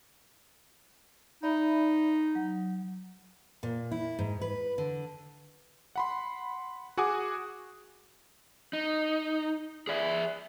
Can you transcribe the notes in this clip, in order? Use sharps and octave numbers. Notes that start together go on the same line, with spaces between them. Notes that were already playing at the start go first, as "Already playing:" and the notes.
D#4 D5 E5 B5
F#3
A#2
E4
G#2
B4
D3
F#5 B5 C6
F#4 G#4 F#5 G#5 D6 D#6
D#4
G#4 D5 E5